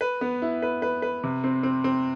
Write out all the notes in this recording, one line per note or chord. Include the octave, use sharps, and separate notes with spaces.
B4
B3
E4
B4
B4
B4
C3
C4
C4
C4